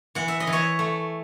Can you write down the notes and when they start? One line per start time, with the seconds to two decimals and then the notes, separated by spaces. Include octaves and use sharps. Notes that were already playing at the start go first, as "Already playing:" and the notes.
0.15 E3 F#5
0.28 E5
0.40 D#5
0.47 E3
0.52 C#5 E5
0.79 A3